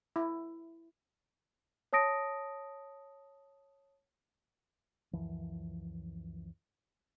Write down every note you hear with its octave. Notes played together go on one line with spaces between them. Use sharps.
E4
C#5 A5 D#6 A#6 D7
C#2 F#2 E3 F3